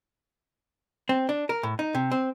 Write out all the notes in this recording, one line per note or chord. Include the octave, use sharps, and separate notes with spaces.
C4
D4
A#4
A2
D#4
C3
C4